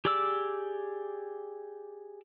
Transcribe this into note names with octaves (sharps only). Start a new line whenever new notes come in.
G4 G#4 D5 D6 E6